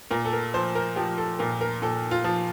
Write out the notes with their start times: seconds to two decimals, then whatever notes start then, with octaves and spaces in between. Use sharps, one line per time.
0.11 A#2 A#4
0.25 A4
0.33 A#4
0.54 F3 C5
0.75 A#4
0.96 F3 G4
1.18 A4
1.39 A#2 A#4
1.61 A#4
1.82 A#2 A4
2.11 F4
2.24 F3